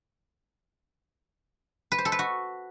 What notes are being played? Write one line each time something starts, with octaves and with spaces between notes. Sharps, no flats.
B4
C5
A4
B4
F#4